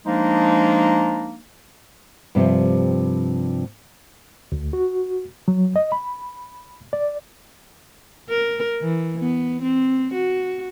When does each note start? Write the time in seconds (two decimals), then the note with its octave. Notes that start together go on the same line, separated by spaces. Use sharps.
0.06 F3 G#3 A#3 D4 D#4
2.35 G2 C3 D#3 F3
4.52 D2
4.73 F#4
5.48 F#3
5.76 D#5
5.92 B5
6.93 D5
8.29 A#4
8.82 E3
9.20 B3
9.62 C4
10.14 F#4